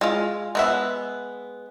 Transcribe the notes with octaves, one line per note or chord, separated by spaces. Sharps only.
G#3 F4
G#3 B3 E5